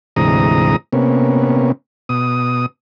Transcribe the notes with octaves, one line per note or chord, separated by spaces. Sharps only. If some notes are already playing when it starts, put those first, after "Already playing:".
D2 G#2 C3 E3 A#5 D#6
C3 A#3 B3 C#4
B2 D#6